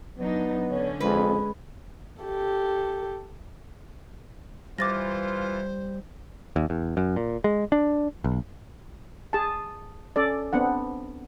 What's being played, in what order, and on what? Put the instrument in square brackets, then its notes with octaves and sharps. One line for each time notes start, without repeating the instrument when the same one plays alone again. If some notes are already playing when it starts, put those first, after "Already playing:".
[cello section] F#3 D4 D#4 [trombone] B3
[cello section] D3 C#4 [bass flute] C#5
[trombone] F2 [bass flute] G#3 [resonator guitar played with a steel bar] B4
[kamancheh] G4 A4
[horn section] E3 F4 [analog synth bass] G3 [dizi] C5 [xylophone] D6 A6 A#6
[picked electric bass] D#2
E2
F#2
A#2
G#3
D4
B1
[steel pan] G#4 A5
C#4 A4 D5
B3 C4 D4 F#5